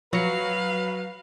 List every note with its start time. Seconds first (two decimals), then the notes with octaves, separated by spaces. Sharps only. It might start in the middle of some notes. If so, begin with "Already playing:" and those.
0.13 F3 F#3 B4 F5 C#7